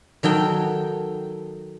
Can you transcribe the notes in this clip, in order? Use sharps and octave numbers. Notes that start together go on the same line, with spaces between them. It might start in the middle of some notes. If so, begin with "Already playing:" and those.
D#3 F#3 A4 G5